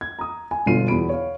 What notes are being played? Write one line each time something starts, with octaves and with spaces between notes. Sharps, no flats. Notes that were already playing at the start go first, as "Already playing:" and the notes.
G#6
A#5 D#6
G#5
G1 B2 D3 F4 C7 D#7
E2 F#4 B5 D7
C#5 F5